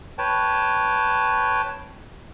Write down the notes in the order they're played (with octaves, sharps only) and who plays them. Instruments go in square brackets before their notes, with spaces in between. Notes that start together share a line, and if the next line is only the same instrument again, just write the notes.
[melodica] B4 C#5 G5 A5